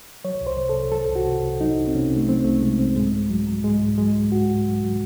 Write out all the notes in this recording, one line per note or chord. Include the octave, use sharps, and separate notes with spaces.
F#3 C#5
C2
C5
C3
A4
C2
F#3 A4
C2
F#4
C3
C2
F#3 D#4
C2
C4
C3 C#4
C2
A3
F#3 C4
C2 A3
C3 G#3
C2 C4
G#2 G#3
G#2
F#3
F#3
G#2 G#3
G#2
F#3 G#3
F#3
G#2 F#4
G#2
F#3
F#3